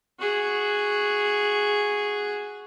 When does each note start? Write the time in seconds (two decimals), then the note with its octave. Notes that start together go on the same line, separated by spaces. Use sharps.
0.19 F#4 G#4